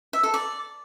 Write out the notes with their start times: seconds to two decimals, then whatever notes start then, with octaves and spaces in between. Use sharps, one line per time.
0.13 E5
0.23 A4
0.34 D5